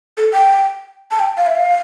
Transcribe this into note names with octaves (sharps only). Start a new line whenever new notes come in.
A4
G5
A5
G5
F5
E5
F5